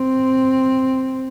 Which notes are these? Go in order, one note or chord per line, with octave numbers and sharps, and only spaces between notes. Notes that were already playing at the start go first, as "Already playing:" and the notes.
Already playing: C4